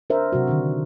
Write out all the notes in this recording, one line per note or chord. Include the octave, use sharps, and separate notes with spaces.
D4 A#4 C5 E5
C3 F#3 F#4
D3 D#3 D4